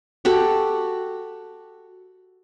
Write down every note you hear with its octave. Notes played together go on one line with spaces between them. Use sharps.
F#4 G4 A4